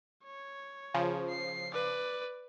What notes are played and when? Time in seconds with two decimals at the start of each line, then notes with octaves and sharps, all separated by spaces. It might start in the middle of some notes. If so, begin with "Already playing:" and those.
0.24 C#5
0.94 C#3 F3
1.28 C7
1.73 B4 D5